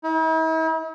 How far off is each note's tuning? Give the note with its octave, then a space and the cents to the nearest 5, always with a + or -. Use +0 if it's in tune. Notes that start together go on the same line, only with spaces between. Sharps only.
E4 -45